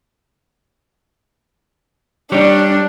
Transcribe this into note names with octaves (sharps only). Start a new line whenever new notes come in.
G3 D4 G4 C#5